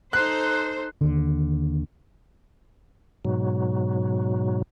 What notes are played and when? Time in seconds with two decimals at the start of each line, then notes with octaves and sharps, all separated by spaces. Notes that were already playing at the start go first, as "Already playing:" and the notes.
0.13 D#4 A4 C5 F#6
1.01 D#2 D3
3.25 G#2 B2 F#3